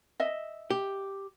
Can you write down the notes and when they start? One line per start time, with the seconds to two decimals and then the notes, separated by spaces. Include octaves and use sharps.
0.20 D#5 E5
0.70 G4